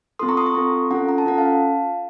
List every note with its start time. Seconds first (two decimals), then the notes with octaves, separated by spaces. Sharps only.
0.19 C4 F4 A4 C6 D#6
0.28 A#5 C#6
0.37 C6 D#6
0.46 A#5 C#6
0.55 C4 F4 A4
0.91 C#4 F4 A4 F#5 A#5
1.09 A#5
1.18 A5
1.26 C#4 F4 A4 F#5
1.38 F5 A5